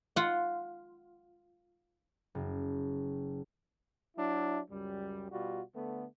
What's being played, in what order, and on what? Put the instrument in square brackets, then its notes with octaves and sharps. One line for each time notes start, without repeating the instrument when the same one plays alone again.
[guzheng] F4 F#5
[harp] F#1
[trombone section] F#3 D4 E4
C#2 F#2 G3
B2 G3 F4 F#4
D3 A3 B3